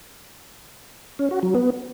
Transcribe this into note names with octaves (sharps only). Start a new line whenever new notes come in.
C#4
F#4
F#3
B3